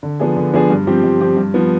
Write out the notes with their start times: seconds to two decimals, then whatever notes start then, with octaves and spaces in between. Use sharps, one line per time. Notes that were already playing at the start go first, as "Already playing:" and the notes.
0.03 D3
0.20 F3 B3 D4 G#4
0.36 D3
0.53 F3 B3 D4 G#4
0.70 G2
0.87 F3 C4 G4
1.04 G2
1.20 F3 C4 G4
1.37 G2
1.54 F3 B3